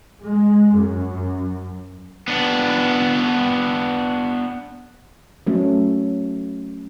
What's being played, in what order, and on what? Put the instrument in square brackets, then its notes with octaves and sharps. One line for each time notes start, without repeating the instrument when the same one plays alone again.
[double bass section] G#3
F#2
[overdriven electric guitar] B3 D4
[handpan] F#3 A3 C#4